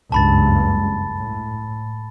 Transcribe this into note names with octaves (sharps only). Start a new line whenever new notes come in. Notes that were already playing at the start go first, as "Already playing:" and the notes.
F#1 C#2 G2 A5 B5 A6
A2